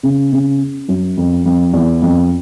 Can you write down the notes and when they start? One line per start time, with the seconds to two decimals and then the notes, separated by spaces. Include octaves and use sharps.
0.03 C#3
0.32 C#3
0.88 F#2
1.17 F2
1.46 F2
1.73 E2
2.02 F2